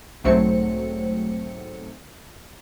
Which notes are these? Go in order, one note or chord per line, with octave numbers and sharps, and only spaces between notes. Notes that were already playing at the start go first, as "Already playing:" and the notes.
B1 G#2 F#3 A3 C4 C#7